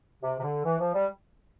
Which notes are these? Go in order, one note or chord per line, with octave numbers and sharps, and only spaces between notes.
C3
C3
D3
E3
F3
G3